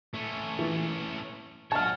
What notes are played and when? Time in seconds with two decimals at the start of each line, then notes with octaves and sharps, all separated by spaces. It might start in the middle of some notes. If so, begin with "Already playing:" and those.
0.15 A3 C#4
0.59 E3
1.72 F#4 C#5 A5 F6